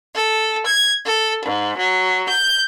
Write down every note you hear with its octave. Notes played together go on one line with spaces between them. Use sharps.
A4
G#6
A4
G#2
F#3
G6